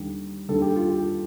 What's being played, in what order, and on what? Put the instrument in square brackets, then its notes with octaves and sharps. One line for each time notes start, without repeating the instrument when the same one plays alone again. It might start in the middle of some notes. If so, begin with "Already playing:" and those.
Already playing: [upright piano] D#2 D3 G3
D#2 D3 G3 A4
G4
F4
G4